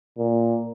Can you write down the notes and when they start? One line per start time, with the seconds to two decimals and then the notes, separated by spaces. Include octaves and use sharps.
0.18 A#2